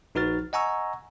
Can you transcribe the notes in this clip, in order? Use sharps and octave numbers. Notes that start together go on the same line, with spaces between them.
A#1 D#4 F#4 B4 F6 A6
D#5 F#5 G#5 A#5 C#6 E6